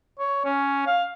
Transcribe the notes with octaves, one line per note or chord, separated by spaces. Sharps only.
C#5
C#4
F5